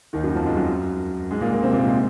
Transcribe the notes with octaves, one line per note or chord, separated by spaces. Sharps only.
D#2 D#3
F#2 F#3
F2 F3
G#2 G#3
F#2 F#3
G#2 G#3
A#2 A#3
A#2 A#3
C3 C4
A#2 A#3
G#2 G#3